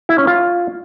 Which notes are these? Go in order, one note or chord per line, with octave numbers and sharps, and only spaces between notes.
E4
C#4
F4